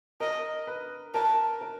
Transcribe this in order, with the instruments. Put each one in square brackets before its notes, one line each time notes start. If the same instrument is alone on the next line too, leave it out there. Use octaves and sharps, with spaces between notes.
[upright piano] A#4 [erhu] D#5
[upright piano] B4
[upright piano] A#4 [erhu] A5
[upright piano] A#4